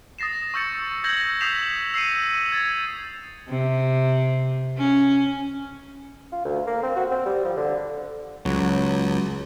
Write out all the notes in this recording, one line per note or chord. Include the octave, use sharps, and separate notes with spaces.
D#6 A6 A#6 C7 E7
C#6 E6 G6 A6 C#7
E6 G6 G#6 A#6 F#7
D#6 G6 B6 C7 E7 F7
E6 C7 C#7 D#7
G#6 A6
C3
C#4
F4
D2
A#3
C4
F#4
C4
G3
F3
D3
C#2 F#3